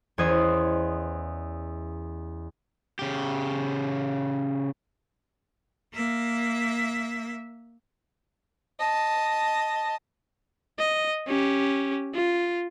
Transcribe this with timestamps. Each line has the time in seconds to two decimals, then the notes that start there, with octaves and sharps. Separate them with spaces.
0.18 E2 C#4 C5 D#5 G#6
2.99 C#3 G4
5.94 A#3 E5
8.79 D#5 A5
10.79 D#5
11.27 C#4 G4
12.14 F4